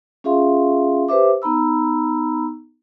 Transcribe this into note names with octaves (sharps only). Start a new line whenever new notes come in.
C#4 F4 G#4 E5 F5 C6
G4 B4 C5 E5 D6
B3 D#4 A#5 B5 E6